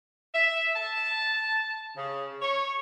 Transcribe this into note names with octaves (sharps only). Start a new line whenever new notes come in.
E5
A5
C#3
C#5